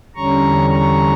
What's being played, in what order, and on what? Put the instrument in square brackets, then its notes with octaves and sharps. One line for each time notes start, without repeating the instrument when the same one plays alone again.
[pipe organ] E2 D3 G3 C#4 A#5 C#6
A#5 C#6